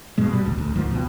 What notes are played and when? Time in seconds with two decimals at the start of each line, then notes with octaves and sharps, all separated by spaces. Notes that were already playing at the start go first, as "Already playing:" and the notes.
0.18 G2 B2 G#3
0.33 B2 G3
0.45 E1 A1 D2
0.58 D2
0.76 D2 G#2 D#3 F3
0.91 C#2 B2